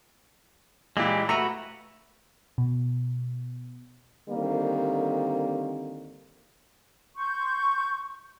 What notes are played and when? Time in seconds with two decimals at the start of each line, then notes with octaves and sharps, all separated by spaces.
0.97 A#2 E3 G#3 G4
1.29 A3 F#4 B4 E5 A#5
2.58 B2
4.30 D3 D#3 G3 A#3 C4
7.17 C6 C#6 G6